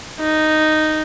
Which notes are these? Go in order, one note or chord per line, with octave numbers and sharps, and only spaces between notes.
D#4